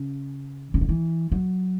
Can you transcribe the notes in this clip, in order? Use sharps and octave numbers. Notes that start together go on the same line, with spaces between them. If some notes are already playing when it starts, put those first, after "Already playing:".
Already playing: C#3
C#3
D3
E3
F#3